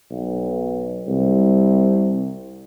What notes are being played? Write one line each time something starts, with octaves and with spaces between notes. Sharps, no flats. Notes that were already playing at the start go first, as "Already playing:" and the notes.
B1
C2